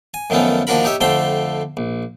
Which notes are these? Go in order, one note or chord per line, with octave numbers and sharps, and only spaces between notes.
G#5
F#2 D#3 F3 A3 B3 C#4
D#2 F3 D4 F#4 A#4 B5
D#4 G4 C#5 E5
F2 D3 A3 C5 G5
A#1